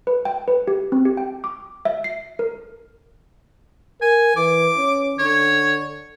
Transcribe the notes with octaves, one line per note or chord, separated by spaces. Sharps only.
B4
G5
B4
G4
C4
G4
G5
D6
E5
C7
A#4
A#4 G#5
E3 D6
C#4
D3 C#5